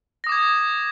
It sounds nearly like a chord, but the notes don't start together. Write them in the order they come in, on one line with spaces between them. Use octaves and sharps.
A#6 D#6 D6 G#6